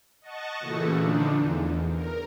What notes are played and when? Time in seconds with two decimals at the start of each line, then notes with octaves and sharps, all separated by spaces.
0.21 D#5 F#5 A5 C#6
0.60 A#2 C#3 E3 A3 F#4
0.96 D3 F3 D4 D#4
1.35 E2
1.91 A#4